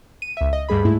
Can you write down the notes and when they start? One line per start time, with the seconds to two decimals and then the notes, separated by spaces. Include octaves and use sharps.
0.22 D#7
0.37 C#2 E5
0.53 D#5
0.69 D2 G2 G3 G#4 B5
0.85 G#2 G#3 A3 E4